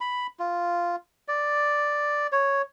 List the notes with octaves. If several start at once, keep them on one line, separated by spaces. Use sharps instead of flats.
B5
F4
D5
C#5